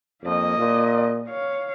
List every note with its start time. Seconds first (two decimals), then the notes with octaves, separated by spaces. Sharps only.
0.24 F2 A#3 D#5
0.58 A#2
1.29 C#5 F5